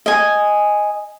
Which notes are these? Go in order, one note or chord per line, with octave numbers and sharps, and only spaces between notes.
D#5 G#5